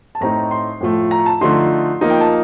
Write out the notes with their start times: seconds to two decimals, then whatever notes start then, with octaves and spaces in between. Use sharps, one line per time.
0.15 A5
0.21 A2 A3 C4 D#4 A#5
0.51 C6
0.81 A2 F3 A3
1.11 A#5
1.26 A5
1.41 D3 F3 A3 D#4 C6
2.01 F3 A#3 D#4
2.10 G5
2.21 A5